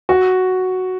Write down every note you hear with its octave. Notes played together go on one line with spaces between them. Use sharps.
F#4